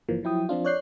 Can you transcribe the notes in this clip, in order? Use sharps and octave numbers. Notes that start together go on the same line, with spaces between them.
G1 E3 F3 A#3
F3 F#3 E4 G5 D#6
F3 C4 D4 F4
C#5 D5 F#6 G6 C7